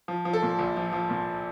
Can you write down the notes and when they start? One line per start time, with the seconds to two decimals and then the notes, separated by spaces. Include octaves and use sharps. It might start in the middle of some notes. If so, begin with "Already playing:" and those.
0.08 F3
0.25 F3
0.33 A4
0.42 A#2
0.59 A#1
0.77 F3
0.93 F3
1.09 A#2